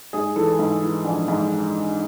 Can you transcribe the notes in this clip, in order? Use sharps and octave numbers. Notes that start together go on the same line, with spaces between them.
G#2 G#4
E3 A4
G#2
E3
A#1
G#2